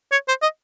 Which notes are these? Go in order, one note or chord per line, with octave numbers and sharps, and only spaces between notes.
C#5
C5
D#5